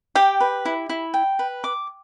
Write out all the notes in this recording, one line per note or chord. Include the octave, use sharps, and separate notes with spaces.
G4 G5
B4
E4
E4
G5
B4
D6